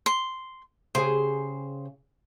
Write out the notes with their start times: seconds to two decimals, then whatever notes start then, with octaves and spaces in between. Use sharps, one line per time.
0.06 C6
0.95 C#3 G4 G#4 C5